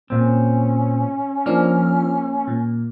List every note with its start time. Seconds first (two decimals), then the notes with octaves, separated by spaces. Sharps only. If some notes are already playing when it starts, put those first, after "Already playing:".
0.10 A#2 C4 C#4
1.46 F3 A#3 D4 F6
2.48 A#2